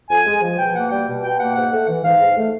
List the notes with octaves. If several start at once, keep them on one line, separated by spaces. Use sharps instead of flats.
F2 G#5
G#3
F3
B2 G5
A#3 F#5
G3 G5
B2
B2 G5
A#3 F#5
G#2 F#5
A3
E3
G#2 F5
G#2
A3